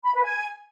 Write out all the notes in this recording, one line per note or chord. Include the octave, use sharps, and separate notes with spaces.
B5
B4
G#5